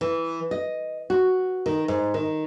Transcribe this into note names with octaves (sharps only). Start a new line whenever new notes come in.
E3
D#5
F#4
D#3
G#2
D#3